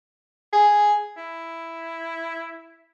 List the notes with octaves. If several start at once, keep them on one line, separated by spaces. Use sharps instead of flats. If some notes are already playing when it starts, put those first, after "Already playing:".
G#4
E4